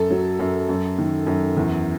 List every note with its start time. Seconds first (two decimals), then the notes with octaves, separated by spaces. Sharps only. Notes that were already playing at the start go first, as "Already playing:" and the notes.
Already playing: F#2 A4
0.11 F#3
0.39 F#2
0.69 F#2
0.98 D#3
1.27 F#2
1.56 E2